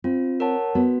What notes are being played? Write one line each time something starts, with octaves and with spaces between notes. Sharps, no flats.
C4 F4
A#4 C#5 F#5 A5
B3 F#4